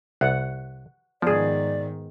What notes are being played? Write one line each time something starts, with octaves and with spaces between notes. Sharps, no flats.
C2 F#5
G#2 D#3 F3 B3 G#4 D5